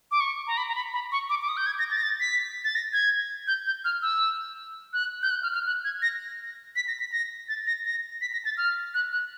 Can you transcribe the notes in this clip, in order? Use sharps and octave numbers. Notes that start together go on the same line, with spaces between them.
D6
C#6
A#5
B5
A#5
B5
B5
C#6
D6
D6
D#6
G6
G#6
A#6
A6
A#6
A6
B6
A6
A#6
G#6
G6
G6
F6
E6
F#6
G6
F#6
F6
F6
F#6
G#6
A#6
B6
A#6
B6
A#6
A6
A#6
A#6
B6
A#6
A6
F6
F#6
F#6